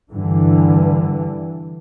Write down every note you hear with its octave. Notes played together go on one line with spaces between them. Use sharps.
G2 D3 E3